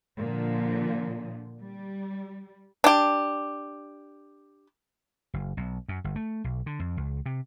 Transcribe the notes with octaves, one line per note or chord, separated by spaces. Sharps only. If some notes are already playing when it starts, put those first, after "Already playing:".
A#2 D3 F3
G3
D4 G4
F#1
B1
F#2
G1
A3
B1
D3
F2
C#2
C3